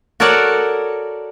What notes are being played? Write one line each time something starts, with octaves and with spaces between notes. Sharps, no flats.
F#4 A4 A#4 C#5 D5 F#5